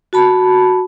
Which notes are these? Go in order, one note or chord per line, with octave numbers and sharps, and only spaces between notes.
F#4 A5 B5